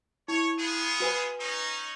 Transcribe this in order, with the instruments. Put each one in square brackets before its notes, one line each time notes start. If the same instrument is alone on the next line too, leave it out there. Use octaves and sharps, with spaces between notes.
[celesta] E4 [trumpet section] C#5
[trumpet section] B3 F4 G#4
[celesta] F#4 B4 G#5
[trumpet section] C#4 D#4